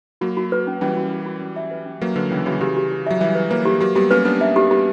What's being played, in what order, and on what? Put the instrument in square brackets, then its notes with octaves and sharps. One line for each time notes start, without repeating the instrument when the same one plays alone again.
[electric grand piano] F#3 A#3 [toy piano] F#4
[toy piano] F#4
B4
C#4
[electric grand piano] E3 G3 [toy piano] C#4
[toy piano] F#4
F#4
F#4
C#4
E5
B4
C#4
[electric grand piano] F#3 A#3 [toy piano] B4
[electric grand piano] D3 F#3 [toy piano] B4
[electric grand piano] C#3 E3 [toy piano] C#4
[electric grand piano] C#3 E3 [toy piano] F#4
[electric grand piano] C#3 E3 [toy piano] G4
[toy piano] G4
G4
[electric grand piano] F#3 [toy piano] E5
[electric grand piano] E3 G3 [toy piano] E5
[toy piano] B4
[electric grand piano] F#3 A#3 [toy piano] B4
[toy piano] G4
[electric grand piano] F#3 A#3 [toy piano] G4
[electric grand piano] G3 B3 [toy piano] G4
[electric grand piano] A#3 C#4 [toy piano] B4
[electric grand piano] B3 D4 [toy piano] B4
[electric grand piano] A#3 C#4 [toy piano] E5
[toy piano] G4
[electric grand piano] G3 B3 [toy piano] G4